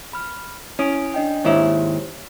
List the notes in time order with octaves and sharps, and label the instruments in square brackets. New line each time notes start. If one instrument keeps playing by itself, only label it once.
[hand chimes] B5 F6
[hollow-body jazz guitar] C#4 [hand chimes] E4 D#6 D7
[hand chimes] D4 D#5 G5
[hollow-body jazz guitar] D#2 G#2 E4 [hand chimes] G4 C5 C#5